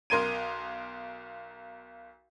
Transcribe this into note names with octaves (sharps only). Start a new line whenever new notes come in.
B1 A#4 C6 G#6 D#7